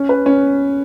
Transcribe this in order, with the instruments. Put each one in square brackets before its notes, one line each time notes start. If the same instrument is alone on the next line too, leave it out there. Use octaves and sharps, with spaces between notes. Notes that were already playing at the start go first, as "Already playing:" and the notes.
Already playing: [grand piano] C#4
B4
C#4